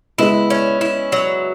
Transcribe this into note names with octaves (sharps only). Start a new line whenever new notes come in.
G#3 B3 E4
C#4
E4
F#3